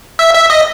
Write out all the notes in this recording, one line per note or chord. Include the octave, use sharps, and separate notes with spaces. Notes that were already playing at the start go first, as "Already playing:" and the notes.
E5
E5
D#5